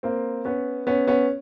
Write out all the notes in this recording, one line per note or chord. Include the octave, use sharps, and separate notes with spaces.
A#3 C4
B3 C#4
B3 C#4
B3 C#4